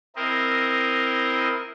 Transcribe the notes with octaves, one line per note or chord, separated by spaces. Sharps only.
C4 E4 A#4 D#5